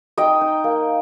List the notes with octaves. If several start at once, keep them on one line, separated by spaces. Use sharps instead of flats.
D#4 D#5 G5
D#4
A#3